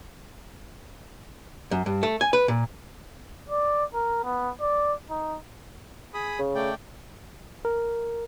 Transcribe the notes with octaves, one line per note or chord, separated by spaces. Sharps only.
F#2
G2
A3
G#5
B4
A#2
D5
A#4
B3
D5
D#4
G#4 B5 D#6
C#3
A3 D5 G5
A#4